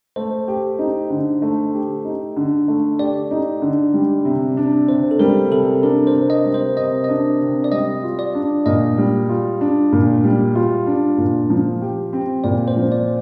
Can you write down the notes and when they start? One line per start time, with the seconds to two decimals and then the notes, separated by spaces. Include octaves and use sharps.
0.16 A3 C5
0.48 G4
0.79 D#4
1.10 D3
1.42 A3
1.74 G4
2.05 D#4
2.36 D3
2.68 A3
2.99 G4 D5
3.31 D#4
3.62 D3
3.94 G3
4.25 C3
4.57 D4
4.89 C3 C5
5.11 A4
5.19 G3 A#4
5.51 C3 A4
5.83 D4 A#4
6.07 C5
6.14 C3
6.30 D#5
6.46 G3
6.54 C5
6.77 C3 D#5
7.04 D4 D#5
7.41 C3
7.64 D5
7.72 G3 D#5
8.03 F4
8.19 D5
8.35 D4
8.66 A#2 D#5
8.98 G3
9.29 F4
9.61 D4
9.93 A#2
10.24 G3
10.55 F4
10.87 D4
11.18 A#2
11.50 F3
11.81 G4
12.13 C4
12.44 A#2 D5
12.68 C5
12.76 F3
12.92 D5